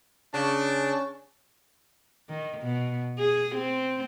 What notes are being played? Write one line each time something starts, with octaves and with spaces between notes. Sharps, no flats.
C#3 D4
D#3
B2
G#4
C4